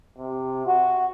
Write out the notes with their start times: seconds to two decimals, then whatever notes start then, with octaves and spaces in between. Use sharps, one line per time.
0.18 C3
0.67 F#4